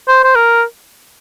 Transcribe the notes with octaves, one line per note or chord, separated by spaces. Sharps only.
C5
C5
A#4